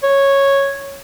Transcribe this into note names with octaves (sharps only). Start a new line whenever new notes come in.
C#5